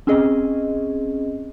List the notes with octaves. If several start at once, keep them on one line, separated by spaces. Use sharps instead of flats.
C4 C#4 G#4 D#5